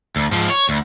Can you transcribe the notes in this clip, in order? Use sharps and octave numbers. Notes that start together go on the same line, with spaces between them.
D2
G#2 F3
C#5
D2